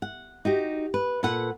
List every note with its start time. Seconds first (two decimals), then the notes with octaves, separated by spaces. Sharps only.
0.02 F#5
0.45 D#4 F#4 G4
0.94 B4
1.23 A#2 A4 B4 F#5